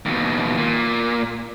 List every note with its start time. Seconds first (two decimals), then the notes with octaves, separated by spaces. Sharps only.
0.05 D#2 B2
0.57 A#2